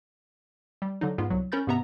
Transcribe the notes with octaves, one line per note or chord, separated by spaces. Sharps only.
G3
D3 F#3 D#4
G#2 B3 F4
C2 F#3
C#4 A#4 B5 G6 A6
G#2 C3 B3 E5 A#5